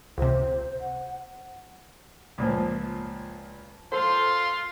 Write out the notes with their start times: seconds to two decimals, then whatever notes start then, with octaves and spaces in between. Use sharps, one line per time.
0.18 C#2 C3 C5
0.80 F#5
2.38 C#2 A#2 F3
3.92 F4 A4 C5 C6